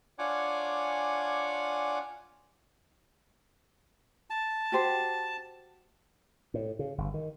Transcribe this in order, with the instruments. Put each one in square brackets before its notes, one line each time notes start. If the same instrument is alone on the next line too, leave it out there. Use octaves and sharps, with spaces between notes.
[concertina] D4 F4 C#5 F#5 G#5 D6
[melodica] A5
[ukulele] F#4 G4 C5
[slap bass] A2
C#3
G1
D#3